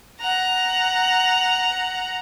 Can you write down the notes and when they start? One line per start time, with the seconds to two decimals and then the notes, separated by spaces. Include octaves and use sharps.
0.21 F#5 A#5